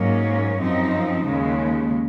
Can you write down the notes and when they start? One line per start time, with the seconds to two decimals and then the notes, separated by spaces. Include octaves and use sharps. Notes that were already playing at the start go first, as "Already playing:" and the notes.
Already playing: G#2 F#3 A#3 C#4
0.58 F#2 F3 C4 D#4
1.25 D#2 C#3 G#3